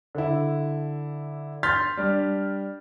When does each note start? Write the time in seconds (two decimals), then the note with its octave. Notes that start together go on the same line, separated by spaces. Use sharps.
0.15 D3 E4
1.63 C6 F6 G6 A6 B6
1.97 G3 D4